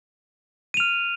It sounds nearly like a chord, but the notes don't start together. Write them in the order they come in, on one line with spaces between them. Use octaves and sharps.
D#7 F7 F6